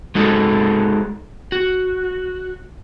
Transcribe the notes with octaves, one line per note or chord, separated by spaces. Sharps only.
G#3 D#4 F#4 A4
F#4